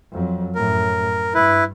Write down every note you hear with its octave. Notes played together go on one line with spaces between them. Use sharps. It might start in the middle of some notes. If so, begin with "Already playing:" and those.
F2 F#3
F#2 A2 A#4
G2 E4 B4